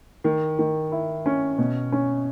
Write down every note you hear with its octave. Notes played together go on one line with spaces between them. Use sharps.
D#3
D#3
E4
C#4
B2
C#4